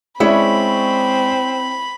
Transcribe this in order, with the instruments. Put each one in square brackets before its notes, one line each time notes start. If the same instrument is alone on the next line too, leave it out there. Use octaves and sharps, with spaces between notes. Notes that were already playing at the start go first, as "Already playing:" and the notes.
[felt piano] G#3 D5 [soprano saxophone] C4 [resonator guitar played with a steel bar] C#4 E4 C#5 [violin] B5